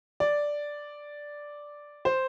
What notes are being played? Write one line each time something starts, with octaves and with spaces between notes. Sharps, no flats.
D5
C5